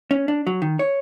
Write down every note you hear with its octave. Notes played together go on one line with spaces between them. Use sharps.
C#4
D4
F#3
D#3
C#5